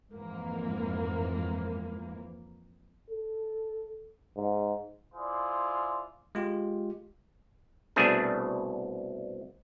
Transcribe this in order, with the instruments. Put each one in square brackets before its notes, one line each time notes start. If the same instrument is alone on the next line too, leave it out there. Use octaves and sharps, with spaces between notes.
[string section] F2 G#2 E3 A#3
[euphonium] A4
G#2
[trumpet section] E4 F4 G#4 C5 D5
[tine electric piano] G#3 F4 G4
[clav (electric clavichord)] C2 B2 A3 D4 G#4